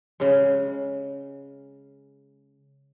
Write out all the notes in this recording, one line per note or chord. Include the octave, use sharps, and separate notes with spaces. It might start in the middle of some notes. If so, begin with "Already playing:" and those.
C#3 G#3